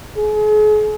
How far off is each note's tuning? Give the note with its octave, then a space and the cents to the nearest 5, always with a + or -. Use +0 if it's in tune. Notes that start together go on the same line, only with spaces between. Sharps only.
G#4 +40